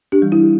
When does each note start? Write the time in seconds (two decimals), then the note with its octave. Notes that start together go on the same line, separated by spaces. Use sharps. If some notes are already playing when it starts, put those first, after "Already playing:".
0.12 D4 G4
0.22 E3 G3
0.32 E4